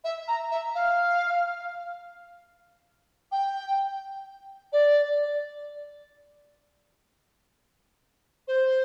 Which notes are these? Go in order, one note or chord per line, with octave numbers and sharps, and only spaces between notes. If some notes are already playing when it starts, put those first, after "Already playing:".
E5
A#5
E5
F5
G5
D5
C5